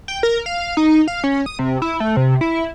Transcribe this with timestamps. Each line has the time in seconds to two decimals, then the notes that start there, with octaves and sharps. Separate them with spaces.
0.08 G5
0.23 A#4
0.46 F5
0.77 D#4
1.08 F5
1.24 C#4
1.46 D#6
1.59 C3
1.82 E4
2.00 A3
2.17 C3
2.41 E4